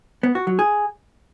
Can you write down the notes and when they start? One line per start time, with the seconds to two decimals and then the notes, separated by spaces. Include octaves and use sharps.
0.23 B3
0.35 F#4
0.47 F#3
0.59 G#4